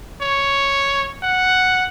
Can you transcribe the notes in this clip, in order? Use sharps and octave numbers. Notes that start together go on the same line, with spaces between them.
C#5
F#5